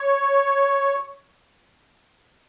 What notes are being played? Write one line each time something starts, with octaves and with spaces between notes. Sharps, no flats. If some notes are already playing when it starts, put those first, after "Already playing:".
Already playing: C#5